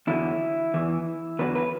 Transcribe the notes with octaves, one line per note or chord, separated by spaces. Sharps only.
E2 D3 F#3 E4
E2 E3
E2 D3 F#3 B4
B4